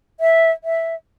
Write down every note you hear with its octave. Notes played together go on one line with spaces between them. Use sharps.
E5
E5